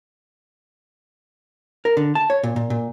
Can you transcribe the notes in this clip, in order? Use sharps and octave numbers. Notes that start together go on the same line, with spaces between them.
A#4
D3
A5
C#5
A#2
A#2
A#2